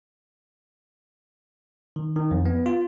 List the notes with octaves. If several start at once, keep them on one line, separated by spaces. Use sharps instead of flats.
D#3
D#3
F2
B3
F4